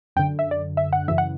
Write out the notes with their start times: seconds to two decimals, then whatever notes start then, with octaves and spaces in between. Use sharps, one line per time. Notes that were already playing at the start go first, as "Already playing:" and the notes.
0.16 F#2 D3 G5
0.39 E5
0.51 D5
0.77 E5
0.93 F#5
1.08 F#2 C#3 E3 E5
1.18 F#5